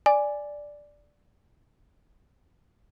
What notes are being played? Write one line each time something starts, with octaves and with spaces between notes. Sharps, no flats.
D5 G#5